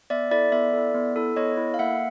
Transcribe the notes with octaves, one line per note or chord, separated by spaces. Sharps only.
B3 D5 E5
E4 A4 D5 E5
B3 D5 E5
E4 A4
B3
E4 A4
B3 C#5 D#5
E4 A4
F5
A#3 E5 F#5